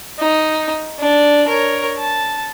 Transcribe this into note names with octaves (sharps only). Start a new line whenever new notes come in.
D#4
D4
A#4 C#5
A5